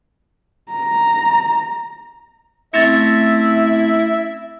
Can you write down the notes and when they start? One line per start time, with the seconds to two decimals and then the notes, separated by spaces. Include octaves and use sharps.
0.72 A#5
2.74 A3 C4 C#4 E4 E5 A6 A#6